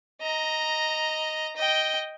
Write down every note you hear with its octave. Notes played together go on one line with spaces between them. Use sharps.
D#5 A#5
D#5 G5